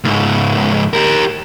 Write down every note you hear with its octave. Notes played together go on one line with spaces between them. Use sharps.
C#2 G#2
G4 A#4